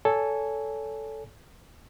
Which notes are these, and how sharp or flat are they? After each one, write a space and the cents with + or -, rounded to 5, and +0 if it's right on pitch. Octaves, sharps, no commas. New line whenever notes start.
A4 +0 C#5 +35 G#5 -5